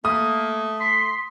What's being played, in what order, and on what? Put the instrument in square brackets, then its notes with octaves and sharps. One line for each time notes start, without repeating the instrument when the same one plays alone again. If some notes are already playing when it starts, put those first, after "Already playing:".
[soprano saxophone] A3 [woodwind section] A#3 [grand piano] D#6
[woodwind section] C6 [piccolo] B6